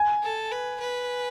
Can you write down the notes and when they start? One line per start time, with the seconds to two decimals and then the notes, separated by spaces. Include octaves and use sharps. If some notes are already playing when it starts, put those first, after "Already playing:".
Already playing: G#5
0.23 A4
0.52 B4
0.80 B4